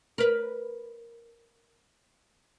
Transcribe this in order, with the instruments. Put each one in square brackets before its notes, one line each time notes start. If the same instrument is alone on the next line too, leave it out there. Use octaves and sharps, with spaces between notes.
[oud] A#4 B4